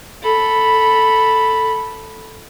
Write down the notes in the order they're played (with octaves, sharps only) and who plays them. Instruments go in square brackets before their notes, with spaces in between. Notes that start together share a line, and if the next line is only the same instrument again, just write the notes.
[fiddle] A4 B5